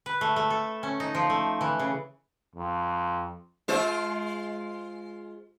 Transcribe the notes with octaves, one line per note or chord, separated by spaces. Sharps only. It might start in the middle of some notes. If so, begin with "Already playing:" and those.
B4
A3
A3
A4
C#4
D#4
F3
A3
E3
C#3
F2
G#3 F4 C5